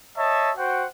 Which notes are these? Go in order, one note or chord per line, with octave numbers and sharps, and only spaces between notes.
C#5 D#5 E5 A5
F#4 C5 F#5 G5